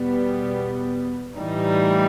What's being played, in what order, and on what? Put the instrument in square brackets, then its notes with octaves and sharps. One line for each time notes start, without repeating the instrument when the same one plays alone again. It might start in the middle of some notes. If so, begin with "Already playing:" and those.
Already playing: [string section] E2 B2 G3 B3
A2 E3 G3 D#4